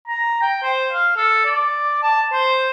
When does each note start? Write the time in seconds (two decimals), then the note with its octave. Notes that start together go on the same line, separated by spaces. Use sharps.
0.08 A#5
0.42 G5
0.63 C5
0.92 F5
1.17 A4
1.45 D5
2.03 A5
2.33 C5